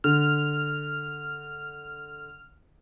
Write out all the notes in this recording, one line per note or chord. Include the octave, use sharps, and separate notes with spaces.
D3 F6